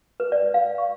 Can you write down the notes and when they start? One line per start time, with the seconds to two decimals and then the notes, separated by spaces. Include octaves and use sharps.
0.20 B4
0.32 D5
0.54 F5
0.78 C#6